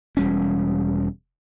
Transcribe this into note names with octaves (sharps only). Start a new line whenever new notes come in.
E1 G3 C#4